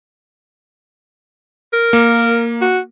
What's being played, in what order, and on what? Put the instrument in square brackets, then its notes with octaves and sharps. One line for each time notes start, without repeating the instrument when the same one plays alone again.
[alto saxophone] A#4
[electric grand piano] A#3
[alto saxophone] F#4